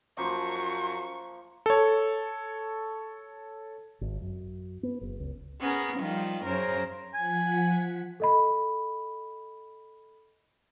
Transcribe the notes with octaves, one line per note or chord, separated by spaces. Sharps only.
F#2 F3 A#3 C5 C#6
A4 C#5
G#1
F#2
B3
F#1
C#2
B3 C#4 G#4 A#4
D#3 F3 G3 F4
F#2 C#3 A#4 C5
F3 F#5 G#5 B6
A4 D#5 B5